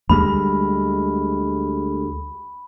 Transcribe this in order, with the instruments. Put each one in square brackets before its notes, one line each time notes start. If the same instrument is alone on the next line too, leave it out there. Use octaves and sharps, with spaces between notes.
[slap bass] D2 G3 G#3 [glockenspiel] B5